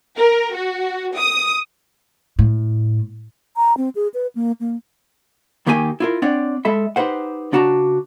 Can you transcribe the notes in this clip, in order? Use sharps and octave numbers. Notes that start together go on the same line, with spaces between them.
A#4
F#4
D#6
A2
A#5
C4
G#4
B4
A#3
A#3
D#2 D#3 A#3 G4 C#5 G#5
E4 F4 A#4
C4 D4 C#5 D5 F#5
G#3 A4 E5 B5
D#4 G4 B4 C5 F#5
C#3 D4 F#4 A5 A#5